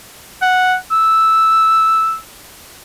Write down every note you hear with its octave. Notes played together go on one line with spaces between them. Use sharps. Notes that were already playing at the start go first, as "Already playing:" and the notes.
F#5
E6